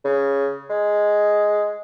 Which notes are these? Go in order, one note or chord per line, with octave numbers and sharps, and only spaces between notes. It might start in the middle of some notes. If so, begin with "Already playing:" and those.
C#3
G#3